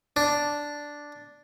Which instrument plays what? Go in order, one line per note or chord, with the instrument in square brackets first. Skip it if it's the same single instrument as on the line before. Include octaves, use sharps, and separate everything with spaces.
[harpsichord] D4